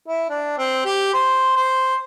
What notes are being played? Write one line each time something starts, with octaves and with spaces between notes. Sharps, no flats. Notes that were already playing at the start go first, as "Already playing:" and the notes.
E4
D4
C4
G4
C5
C5